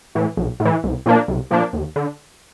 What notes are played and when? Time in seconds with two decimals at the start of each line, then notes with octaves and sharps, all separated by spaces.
0.15 A2 E3
0.37 B1
0.60 A2
0.65 E3
0.84 C2
1.06 A#2 F3 A#3 D4
1.28 C2
1.51 A#2 F3 A#3 D4
1.73 D#2
1.96 D3